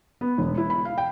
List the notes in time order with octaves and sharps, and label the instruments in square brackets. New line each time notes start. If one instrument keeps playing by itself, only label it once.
[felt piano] B3
E1
E4
B5
F5
G5